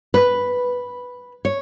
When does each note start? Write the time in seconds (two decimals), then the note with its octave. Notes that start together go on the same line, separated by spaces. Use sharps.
0.14 B4
1.45 C#5